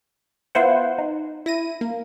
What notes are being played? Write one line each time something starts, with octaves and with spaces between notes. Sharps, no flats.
B3 E4 F4 C5 F#5
D#4
E4 A#6 D#7
A#3